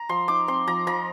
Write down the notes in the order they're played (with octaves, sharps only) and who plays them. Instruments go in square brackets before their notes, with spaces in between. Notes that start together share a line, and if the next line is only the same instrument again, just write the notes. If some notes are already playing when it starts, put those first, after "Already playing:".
Already playing: [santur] A#5
F3 C6
D#4 D6
C4 C6
F3 A#5
F3 A#5